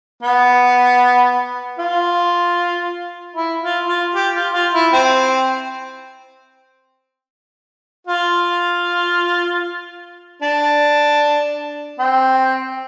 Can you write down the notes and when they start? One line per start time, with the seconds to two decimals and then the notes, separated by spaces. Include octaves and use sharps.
0.23 B3
1.79 F4
3.36 E4
3.62 F4
3.88 F4
4.14 G4
4.34 F4
4.54 F4
4.73 E4
4.93 C4
8.07 F4
10.42 D4
11.99 C4